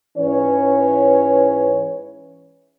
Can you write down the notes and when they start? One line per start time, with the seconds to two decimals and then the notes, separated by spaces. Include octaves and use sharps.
0.17 G#2 E3 C#4 B4 C#5